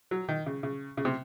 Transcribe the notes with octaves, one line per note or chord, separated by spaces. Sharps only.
F#3
D#3
C#3
C#3
C#3
C3